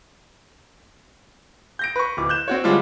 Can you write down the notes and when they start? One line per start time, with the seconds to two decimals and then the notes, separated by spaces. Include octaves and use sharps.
1.79 G6 A#6 D7
1.96 B4 C#6
2.17 D1 D6
2.29 F#6 G6 E7
2.48 C4 F#4 C#5
2.64 D3 G3 G#3 D4 F4